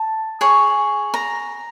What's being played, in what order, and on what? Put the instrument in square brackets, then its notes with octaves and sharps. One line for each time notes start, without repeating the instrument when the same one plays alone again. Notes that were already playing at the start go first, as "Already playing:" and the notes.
Already playing: [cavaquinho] A5
G#4 C#5
A#5